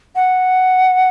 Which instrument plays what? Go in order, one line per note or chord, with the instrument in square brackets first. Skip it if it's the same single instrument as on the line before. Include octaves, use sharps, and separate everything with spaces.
[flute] F#5